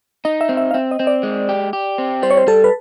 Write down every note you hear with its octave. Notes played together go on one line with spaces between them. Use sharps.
D#4 D#5
E5
C4
E5
F5
C4 E5
D#5
C4
D5
G#3
G4
G4
C4
G3 C5
C#5
C5
G3 A4
B4